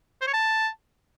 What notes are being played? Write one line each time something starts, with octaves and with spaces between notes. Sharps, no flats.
C5
C#5
A5